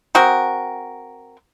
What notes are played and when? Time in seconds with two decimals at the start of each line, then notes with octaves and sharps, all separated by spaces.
0.15 C4 F#4 G#4 A#4